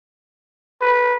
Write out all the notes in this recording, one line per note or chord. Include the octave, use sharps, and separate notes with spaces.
B4